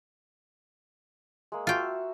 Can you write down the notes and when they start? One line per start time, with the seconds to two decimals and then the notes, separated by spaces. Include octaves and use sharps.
1.52 G#3 A#3
1.67 F4 F#4 E5 G5 A5